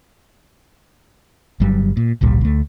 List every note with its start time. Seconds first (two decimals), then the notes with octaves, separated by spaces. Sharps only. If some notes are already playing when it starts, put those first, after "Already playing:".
1.60 G1 G2 F#3 G3
1.97 A#2
2.21 G#1 C#2 A#2 G3
2.41 D2 A3